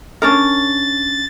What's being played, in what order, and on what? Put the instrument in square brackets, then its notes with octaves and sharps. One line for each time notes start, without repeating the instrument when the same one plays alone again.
[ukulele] C#4 D4 A#4 [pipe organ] A6